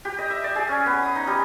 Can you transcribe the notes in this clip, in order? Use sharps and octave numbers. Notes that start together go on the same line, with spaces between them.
G4
D#5
E5
D5
G#4
C#4
B3
D#6
D#4
G3